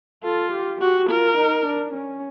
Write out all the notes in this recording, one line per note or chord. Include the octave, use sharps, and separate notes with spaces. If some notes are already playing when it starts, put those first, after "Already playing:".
F4 A4
G4
F#4 G4
F4 A#4
D#4
D4
C#4